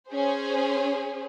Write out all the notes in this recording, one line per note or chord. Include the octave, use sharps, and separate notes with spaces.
C#4 G#4 C5